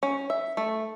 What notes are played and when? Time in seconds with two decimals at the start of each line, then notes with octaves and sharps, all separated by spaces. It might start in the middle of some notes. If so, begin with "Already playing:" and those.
0.03 C#4
0.30 E5
0.57 A3